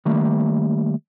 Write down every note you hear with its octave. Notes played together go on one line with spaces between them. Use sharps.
D#3 G3 A3 A#3